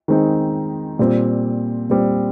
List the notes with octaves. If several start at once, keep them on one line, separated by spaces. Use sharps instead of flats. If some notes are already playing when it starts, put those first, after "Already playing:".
D#3 G#3 C4 D#4
A#2 G3 C4
A#2 G3 C4